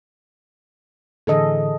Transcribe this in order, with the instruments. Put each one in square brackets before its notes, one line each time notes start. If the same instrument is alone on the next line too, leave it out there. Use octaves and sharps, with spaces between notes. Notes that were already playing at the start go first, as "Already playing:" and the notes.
[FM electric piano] A2 D3 E3 [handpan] G#4 A4 D#5